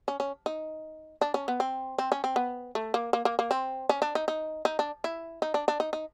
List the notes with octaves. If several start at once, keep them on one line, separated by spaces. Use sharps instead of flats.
C#4
C#4
D#4
D4
C#4
B3
C4
C4
C#4
C4
B3
A3
A#3
A#3
A#3
A#3
C4
C#4
D4
D#4
D#4
D#4
D4
E4
D#4
D4
D4
D#4
D#4